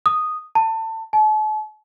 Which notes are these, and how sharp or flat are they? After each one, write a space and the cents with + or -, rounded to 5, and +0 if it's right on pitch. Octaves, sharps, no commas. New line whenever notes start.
D#6 -5
A5 +25
A5 -40